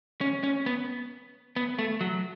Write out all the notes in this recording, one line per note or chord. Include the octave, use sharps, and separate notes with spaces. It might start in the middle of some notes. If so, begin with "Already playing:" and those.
C#4
C#4
B3
B3
A3
F#3